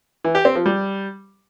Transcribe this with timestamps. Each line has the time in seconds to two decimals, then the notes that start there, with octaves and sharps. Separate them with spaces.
0.24 E3
0.35 G4
0.45 C4
0.55 F3
0.66 G3